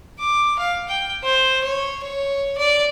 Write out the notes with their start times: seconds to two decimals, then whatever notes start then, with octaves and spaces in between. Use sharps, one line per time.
0.20 D6
0.59 F5
0.88 G5
1.24 C5
1.63 C#5
2.03 C#5
2.58 D5